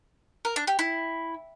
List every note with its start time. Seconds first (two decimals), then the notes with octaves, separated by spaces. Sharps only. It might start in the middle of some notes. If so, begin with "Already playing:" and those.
0.45 A#4
0.56 D4
0.67 G4
0.79 E4